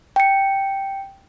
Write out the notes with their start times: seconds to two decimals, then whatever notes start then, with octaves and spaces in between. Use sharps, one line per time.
0.16 G5 C#7